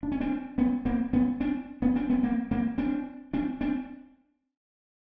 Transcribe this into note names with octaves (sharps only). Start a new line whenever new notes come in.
D4
C#4
C4 D4
B3 C#4
A#3 C4
B3 C#4
C4 D4
B3 C#4
C4 D4
B3 C#4
A#3 C4
A#3 C4
C4 D4
C4 D4
C4 D4